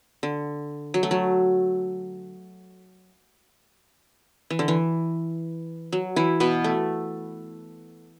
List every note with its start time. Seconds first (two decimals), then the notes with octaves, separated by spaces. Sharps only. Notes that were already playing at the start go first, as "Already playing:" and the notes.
0.23 D3
0.94 F#3
1.03 A3
1.11 F#3
4.50 E3
4.59 D3
4.68 E3
5.93 F#3
6.16 E3 E4
6.40 B2 B3
6.64 A3